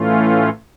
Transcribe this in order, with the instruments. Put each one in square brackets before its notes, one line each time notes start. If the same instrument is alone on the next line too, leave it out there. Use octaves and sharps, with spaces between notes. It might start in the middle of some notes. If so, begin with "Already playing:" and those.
Already playing: [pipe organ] A2 E3 A3 C#4 F4